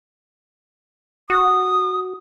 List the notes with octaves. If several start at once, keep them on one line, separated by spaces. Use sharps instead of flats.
F#4 D#6